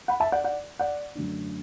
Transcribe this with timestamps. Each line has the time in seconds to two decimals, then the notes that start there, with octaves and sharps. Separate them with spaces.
0.08 F#5 B5
0.20 E5 A5
0.32 D5 F#5
0.44 D5 F#5
0.79 D5 F#5
1.15 F#2 D3 A3 D4